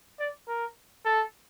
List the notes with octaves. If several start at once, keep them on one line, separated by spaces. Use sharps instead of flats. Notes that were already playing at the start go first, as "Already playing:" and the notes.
D5
A#4
A4